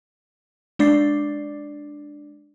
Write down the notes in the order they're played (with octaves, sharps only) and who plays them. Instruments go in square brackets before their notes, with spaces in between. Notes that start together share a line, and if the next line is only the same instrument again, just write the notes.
[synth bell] G#3 D4 D5 D6 A6 C7